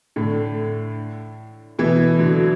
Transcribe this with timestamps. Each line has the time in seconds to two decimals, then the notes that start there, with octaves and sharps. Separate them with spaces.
0.16 A2 D3
1.79 B2 E3
2.19 D3 F#3